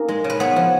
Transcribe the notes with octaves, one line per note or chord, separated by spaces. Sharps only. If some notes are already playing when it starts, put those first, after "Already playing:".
Already playing: A#3 D#4 G#4 A#4
G#3
C#3
B4
B3 C#5
F3